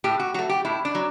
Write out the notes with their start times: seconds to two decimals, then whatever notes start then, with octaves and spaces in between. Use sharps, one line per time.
0.04 A2 G4
0.19 F#4
0.34 F#3 A3 F#4
0.49 G4
0.65 A2 E4
0.85 D4
0.95 F#3